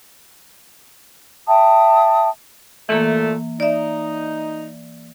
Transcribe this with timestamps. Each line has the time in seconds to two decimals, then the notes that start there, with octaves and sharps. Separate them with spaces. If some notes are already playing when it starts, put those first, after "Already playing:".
1.48 E5 G5 A5 D#6
2.89 A#2 E3 A3 A#3
3.60 D#4 D5 E5